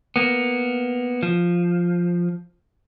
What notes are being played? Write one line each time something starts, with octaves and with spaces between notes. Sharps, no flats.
A#3 B3
F3